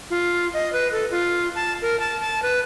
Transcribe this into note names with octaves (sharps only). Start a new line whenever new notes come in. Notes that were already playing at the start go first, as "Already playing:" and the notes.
F4
D#5
B4
A4
F4
A5
A#4
A5
A5
B4